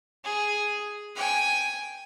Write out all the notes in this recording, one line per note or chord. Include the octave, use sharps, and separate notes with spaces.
G#4
G5 G#5